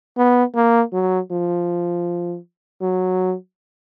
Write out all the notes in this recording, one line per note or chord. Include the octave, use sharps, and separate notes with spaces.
B3
A#3
F#3
F3
F#3